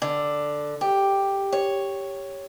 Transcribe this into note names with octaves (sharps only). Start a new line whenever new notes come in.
D3
G4
C#5